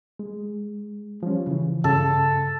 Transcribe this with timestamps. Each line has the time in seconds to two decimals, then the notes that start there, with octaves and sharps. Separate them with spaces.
0.19 G#3
1.23 F3 G3 C#4
1.47 C#3 E3
1.84 G2 C#3 A4